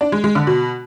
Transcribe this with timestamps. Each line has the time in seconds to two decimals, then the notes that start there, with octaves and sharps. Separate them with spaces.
0.01 D4
0.12 G#3
0.24 G#3
0.35 D3
0.47 B2